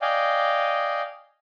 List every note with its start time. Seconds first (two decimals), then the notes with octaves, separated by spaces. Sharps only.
0.02 D5 D#5 F5 G5 G#5